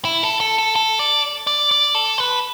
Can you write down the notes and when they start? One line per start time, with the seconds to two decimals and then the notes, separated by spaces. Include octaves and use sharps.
0.05 E4
0.23 A4
0.40 A4
0.59 A4
0.76 A4
0.99 D5
1.47 D5
1.71 D5
1.95 A4
2.18 B4